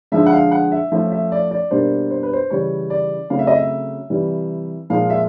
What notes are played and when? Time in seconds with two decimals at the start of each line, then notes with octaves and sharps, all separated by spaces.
0.12 D3 F3 G#3 E5
0.26 F#5
0.32 F5
0.52 F#5
0.72 E5
0.92 F3 A3 C#4 E5
1.12 E5
1.32 D5
1.51 D5
1.71 B2 G3 A#3 D4 C5
2.11 C5
2.23 B4
2.33 C5
2.50 C#3 E3 G3 C#5
2.90 D5
3.30 C#3 F#3 A3 C4 F5
3.39 E5
3.47 D#5
3.55 E5
4.10 C3 E3 G3
4.90 A#2 F3 G#3 F5
5.10 E5